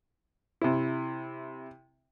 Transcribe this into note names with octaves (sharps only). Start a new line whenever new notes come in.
C3 E4